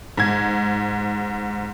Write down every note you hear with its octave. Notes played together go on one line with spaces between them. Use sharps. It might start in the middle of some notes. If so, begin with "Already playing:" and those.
G#2 G#6